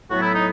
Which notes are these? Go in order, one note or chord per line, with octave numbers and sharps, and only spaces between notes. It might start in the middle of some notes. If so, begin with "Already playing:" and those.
A2 F#3 B3 F#4
E4
D#4